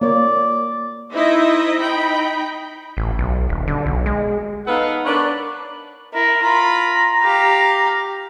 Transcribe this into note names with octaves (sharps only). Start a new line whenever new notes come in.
A#3 C#5 D5
D#4 E4 C5 D#5 E5
D#4 G5 B5
A1
B1
D#1
D3
B1
G#3
B3 D#4 A4 B4 F5 F#5
D4 A#4 B4 C#5 D5
E4 A#4
F4 A#5 B5
G4 F5